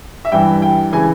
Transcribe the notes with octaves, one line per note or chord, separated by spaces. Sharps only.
E5
G2 E3 G5
G5
C#3 E3 G#5